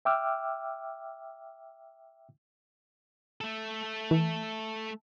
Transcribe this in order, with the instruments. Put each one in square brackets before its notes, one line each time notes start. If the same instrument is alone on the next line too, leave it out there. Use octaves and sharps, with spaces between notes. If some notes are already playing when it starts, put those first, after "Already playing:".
[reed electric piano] E5 G5 D6 E6 F6
[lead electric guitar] A3 A4
[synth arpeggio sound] E3